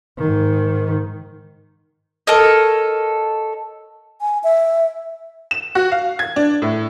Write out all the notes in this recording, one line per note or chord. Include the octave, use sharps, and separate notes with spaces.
G#2 D#3
A4 A#4 C#5 D#5
G#5
E5
E7
F#4
F5
G#6
D4
A2